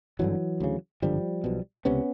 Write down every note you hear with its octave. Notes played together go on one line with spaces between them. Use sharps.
G#1 G2 D3 E3 F#3
D2 C#3
G#1 G2 D3 F3 G3
B1 B2
C#2 C3 B3 C#4